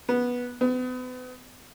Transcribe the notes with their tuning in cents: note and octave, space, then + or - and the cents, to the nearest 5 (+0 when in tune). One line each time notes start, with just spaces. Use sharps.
B3 -10
B3 +35